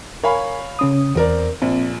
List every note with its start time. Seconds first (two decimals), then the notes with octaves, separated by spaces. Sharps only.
0.24 A#4 C#5 F5 G#5 B5
0.79 C#3 C#4 D#6
1.15 E2 C4 A#4 D5
1.62 A#1 C4